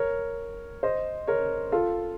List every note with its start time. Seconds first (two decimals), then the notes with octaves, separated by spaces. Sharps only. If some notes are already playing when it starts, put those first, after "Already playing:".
Already playing: A#4 C#5
0.83 C5 D#5
1.27 A#4 C#5
1.72 F4 A4